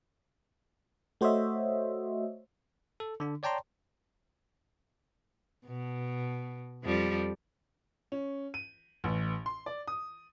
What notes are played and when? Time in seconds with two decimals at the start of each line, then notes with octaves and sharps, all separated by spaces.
1.21 A3 F#4 C5 C#5 D#5 E5
3.00 A4
3.20 D3 D4
3.43 C#5 D5 G5 A5 A#5 C6
5.66 B2
6.83 F2 F3 G3
8.12 C#4
8.54 D#7
9.04 A1
9.46 C6
9.66 D5
9.88 D#6